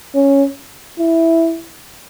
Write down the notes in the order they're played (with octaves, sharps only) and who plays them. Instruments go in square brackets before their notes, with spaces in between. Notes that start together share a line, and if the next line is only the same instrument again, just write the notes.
[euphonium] C#4
E4